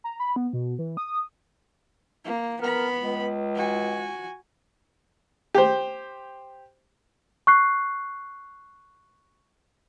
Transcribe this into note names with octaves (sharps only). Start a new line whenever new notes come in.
A#5
B5
B3
B2
E3
D#6
A#3
B3 A#4 B5
C#2
F#4 G#5
G4 C5
C#6 F#6 C7